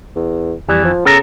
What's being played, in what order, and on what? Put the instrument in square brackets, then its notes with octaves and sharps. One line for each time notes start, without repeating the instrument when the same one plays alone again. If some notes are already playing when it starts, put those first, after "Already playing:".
[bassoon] E2
[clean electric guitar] F2 E3 [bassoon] G3
[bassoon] F3
[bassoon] C#3 [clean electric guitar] B3 A4 A#5